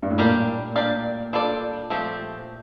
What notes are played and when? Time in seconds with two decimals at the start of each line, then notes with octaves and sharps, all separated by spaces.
0.02 G2
0.10 A2
0.18 A#2 G3 D4 G4 A#4 F5
0.76 A#3 D4 G4 D5 F5
1.33 G3 D4 F4 A4 D5
1.90 F3 A3 C4 G4